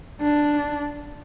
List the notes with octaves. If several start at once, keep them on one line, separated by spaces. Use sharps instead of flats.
D4